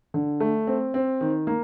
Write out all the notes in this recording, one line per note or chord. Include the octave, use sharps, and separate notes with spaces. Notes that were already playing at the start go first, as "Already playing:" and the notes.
D3
A3
C4
C4
D#3
A#3